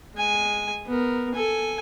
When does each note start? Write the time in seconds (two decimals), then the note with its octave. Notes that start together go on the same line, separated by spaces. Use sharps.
0.14 G#3 G#5
0.86 B3 A#4
1.35 A4 G#5